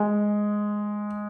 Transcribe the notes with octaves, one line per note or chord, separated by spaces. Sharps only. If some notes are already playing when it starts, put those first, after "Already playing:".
Already playing: G#3